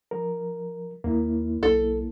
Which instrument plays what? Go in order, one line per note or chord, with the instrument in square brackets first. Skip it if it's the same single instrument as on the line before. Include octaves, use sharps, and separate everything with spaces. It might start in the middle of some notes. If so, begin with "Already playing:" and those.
[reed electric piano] F3 A#4
[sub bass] D#2 [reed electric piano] A#3 E4
[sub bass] B1 [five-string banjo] A4